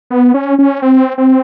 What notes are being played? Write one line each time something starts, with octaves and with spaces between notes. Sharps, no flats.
B3
C#4
C#4
C4
C4